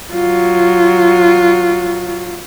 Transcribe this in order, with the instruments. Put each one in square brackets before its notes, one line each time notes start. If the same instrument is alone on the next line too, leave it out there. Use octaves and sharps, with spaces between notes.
[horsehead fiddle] F#3 F4